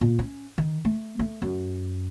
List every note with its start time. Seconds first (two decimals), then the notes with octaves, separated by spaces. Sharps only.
0.01 A#2
0.19 C#4
0.58 D#3
0.85 A3
1.19 A3
1.42 F#2